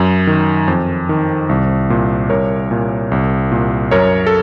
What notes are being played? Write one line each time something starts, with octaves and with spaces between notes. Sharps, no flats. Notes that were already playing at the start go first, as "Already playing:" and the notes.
Already playing: F#2
D#3
F2
D#3
C2
A#2
C2 A#4 C#5
A#2
C2
A#2
F#2 A#4 C#5
A4